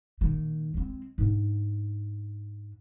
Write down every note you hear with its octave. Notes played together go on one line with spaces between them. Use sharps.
A#2 D#3
G#3 C4
G#2 D3